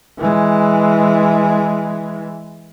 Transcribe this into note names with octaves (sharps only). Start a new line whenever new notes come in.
E3 G#3